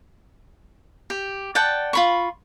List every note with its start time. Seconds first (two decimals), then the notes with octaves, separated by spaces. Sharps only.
1.10 G4
1.55 D5 F#5 G5 A5
1.93 F4 B5 C#6